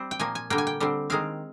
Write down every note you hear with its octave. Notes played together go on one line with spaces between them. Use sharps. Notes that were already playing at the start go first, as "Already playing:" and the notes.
Already playing: G3 C4
G5
A#2 F3 A#3 G#5
G#5
D3 G3 A#3 G5
G#5
G5
D3 G3 C4
D#3 G#3 C4 F5